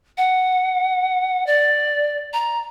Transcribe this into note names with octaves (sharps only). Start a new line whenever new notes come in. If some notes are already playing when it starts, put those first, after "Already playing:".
F#5
D5
A#5